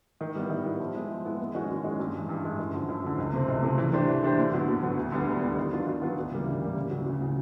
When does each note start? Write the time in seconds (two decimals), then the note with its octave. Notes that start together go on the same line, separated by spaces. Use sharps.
0.21 D#3
0.35 G3 B3 E4
0.50 D#3
0.65 G3 B3 E4
0.80 F3
0.95 G#3 B3 E4
1.10 F3
1.25 G#3 B3 E4
1.39 D#2
1.54 D#3 G#3 C#4 F#4
1.70 D#2
1.84 D#3 G#3 C#4 F#4
2.00 G2
2.14 E3 G#3
2.29 G2
2.44 E3 G#3
2.59 F#2
2.74 D3 F3
2.88 F#2
3.04 D3 F3
3.18 C#2
3.33 C3 F3 A3 C4
3.48 C#2
3.63 C3 F3 A3 C4
3.78 E3
3.93 A3 D4 G4 C5
4.08 E3
4.22 A3 D4 G4 C5
4.37 D#2
4.52 D3 F#3 B3
4.68 D#2
4.82 D3 F#3 B3
4.97 D2
5.12 D3 G3 B3
5.27 D2
5.41 D3 G3 B3
5.57 D#3
5.72 F#3 B3 D4 F4
5.86 D#3
6.02 F#3 B3 D4 F4
6.17 D2
6.31 C#3 E3 G3 A#3
6.46 D2
6.61 C#3 E3 G3 A#3
6.76 D2
6.91 C#3 F#3
7.06 D2
7.21 C#3 F#3